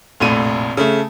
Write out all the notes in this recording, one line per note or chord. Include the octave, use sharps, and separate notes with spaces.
F1 A#1 A2 D#7
C#3 A3